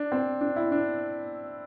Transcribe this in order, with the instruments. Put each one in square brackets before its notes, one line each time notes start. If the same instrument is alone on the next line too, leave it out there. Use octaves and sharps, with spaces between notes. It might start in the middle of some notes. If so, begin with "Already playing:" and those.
Already playing: [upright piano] D4
C4
D4
E4
D4